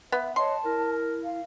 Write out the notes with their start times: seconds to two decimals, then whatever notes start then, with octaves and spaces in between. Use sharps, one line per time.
0.12 B3 B4 E5
0.36 C#5 D#5 A5 C6
0.65 E4 A#4
1.24 F5